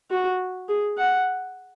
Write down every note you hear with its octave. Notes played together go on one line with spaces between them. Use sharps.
F#4
G#4
F#5